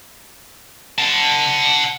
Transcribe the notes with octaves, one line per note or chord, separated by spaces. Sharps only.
F#5 A5